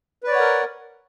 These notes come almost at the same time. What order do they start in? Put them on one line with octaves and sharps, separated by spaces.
B4 D5 C#5 F#5 A#4